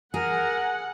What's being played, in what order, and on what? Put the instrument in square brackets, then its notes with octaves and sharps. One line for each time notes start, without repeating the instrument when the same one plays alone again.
[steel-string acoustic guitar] G#4 [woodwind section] A#4 [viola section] F#5 [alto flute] G#5